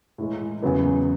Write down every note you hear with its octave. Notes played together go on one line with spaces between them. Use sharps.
A2 E3 G#3
E2 C#3 F#3 B3